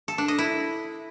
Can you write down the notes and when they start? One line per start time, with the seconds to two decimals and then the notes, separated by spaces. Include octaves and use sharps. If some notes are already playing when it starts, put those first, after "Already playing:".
0.08 A4
0.18 D4
0.28 D#5
0.38 E4